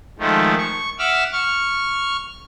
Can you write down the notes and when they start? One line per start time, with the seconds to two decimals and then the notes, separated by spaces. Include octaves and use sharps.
0.19 D#3 F3 G#3 A3
0.58 C#6
0.99 E5 F#5 D6 E6 F6
1.32 C#6 F6